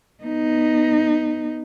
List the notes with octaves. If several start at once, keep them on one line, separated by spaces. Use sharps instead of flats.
B3 D#4